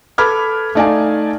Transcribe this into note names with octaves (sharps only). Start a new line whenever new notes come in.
A4 B4 B5 D6 F6 G#6
A3 D#4 D5 F5 G#5 A5